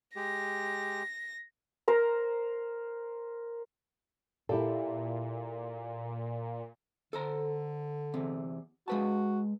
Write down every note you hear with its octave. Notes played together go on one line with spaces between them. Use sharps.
G#3 G4 A#6
A#4 C5 A#5
A#2 E4 G4 A4
D3 A4 C5 A#5
E2 C3
G#3 F#4 B4 A5